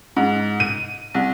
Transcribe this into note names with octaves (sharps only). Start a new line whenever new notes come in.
G#2
D#7
C2